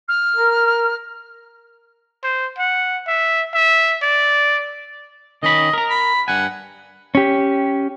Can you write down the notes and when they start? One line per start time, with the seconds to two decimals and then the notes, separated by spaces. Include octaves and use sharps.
0.08 F6
0.36 A#4
2.24 C5
2.58 F#5
3.07 E5
3.53 E5
4.02 D5
5.43 D#3 C#4 D#5 B5
5.73 A#4 A#5
5.90 B5
6.28 G2 F#5 G#5
7.15 C#4 G4